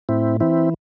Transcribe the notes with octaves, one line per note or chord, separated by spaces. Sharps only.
A2 C4 E4
E3 C4 E4